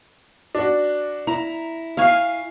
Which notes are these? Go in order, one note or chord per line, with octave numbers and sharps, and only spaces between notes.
D4 F#4
E4 A#5 F7
F5 G#5 C#6 F6 C7